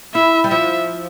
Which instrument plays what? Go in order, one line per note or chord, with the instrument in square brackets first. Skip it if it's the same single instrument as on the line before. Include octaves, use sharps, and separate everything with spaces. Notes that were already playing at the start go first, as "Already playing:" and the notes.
[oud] E4 [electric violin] E5
[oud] G3
[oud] F3 [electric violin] E5